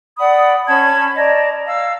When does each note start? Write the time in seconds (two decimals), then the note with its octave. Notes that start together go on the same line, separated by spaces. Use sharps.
0.18 D5 F#5 B5 D#6
0.67 C#4 A5 B5 G#6
1.17 D5 D#5 A5 A#5
1.67 F5 E6